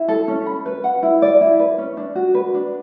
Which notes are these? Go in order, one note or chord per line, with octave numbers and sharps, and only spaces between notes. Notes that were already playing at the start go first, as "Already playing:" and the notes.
Already playing: E4
A4
C#4
B5
B4
F#5
E4
D5
E4
B4
C#4
D4
F#4
B4
D4